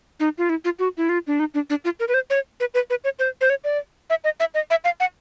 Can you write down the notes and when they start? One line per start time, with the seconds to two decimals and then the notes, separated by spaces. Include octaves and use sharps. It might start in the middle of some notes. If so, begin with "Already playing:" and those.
0.20 D#4
0.38 F4
0.49 E4
0.65 F4
0.79 F#4
0.97 E4
1.09 F4
1.27 D4
1.40 D#4
1.54 D4
1.70 D4
1.85 F4
2.00 A#4
2.08 B4
2.14 C5
2.30 C#5
2.60 B4
2.74 B4
2.90 B4
3.04 C#5
3.19 C5
3.41 C5
3.50 C#5
3.64 D5
4.10 E5
4.24 D#5
4.40 E5
4.54 D#5
4.70 E5
4.84 F5
5.00 F#5